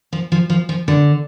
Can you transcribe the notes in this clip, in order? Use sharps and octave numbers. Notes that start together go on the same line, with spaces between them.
F3
F3
F3
F3
D3